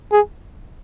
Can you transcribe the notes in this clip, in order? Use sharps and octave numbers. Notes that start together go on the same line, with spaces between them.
G#4